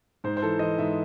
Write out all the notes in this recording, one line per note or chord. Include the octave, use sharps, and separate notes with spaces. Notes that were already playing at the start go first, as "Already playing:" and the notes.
G#2 C5
C5
E3 A4
E3 D#5
G#2 E5